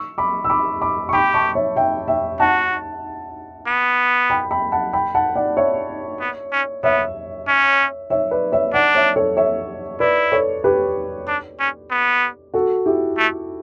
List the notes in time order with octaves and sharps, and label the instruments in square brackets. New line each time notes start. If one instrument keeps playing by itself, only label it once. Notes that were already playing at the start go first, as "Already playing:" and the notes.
Already playing: [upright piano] C#6 E6
B5 D6
E6
B5 D6
B5 D6
C#6
[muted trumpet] G4 [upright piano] G5 B5
[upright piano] A5 C#6
C#5 E5
E5 G5
E5 G5
[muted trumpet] F#4 [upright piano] F#5 A5
[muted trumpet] B3
[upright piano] G5 B5
G5 B5
F#5 A5
G5 B5
F#5 A5
D5 F#5
C#5 E5
[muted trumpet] B3
C#4
[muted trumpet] B3 [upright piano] C#5 E5
[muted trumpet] C#4
[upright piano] C#5 E5
B4 D5
C#5 E5
[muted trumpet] D4 [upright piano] D5 F#5
[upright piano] C#5 E5
A4 C#5
C#5 E5
[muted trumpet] E4 [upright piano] B4 D5
[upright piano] A4 C#5
G4 B4
[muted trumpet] D4
C#4
B3
[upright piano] F#4 A4
E4 G4
[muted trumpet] A3